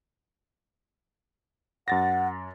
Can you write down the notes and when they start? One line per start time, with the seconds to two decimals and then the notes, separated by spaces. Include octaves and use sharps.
1.88 F#2 F#5 A6 A#6